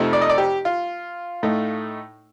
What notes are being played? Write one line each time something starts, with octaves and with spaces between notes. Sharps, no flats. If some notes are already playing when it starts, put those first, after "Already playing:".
Already playing: F2 C3 F3 A3 D#4
D5
D#5
D5
G4
F4
A2 A3 D#4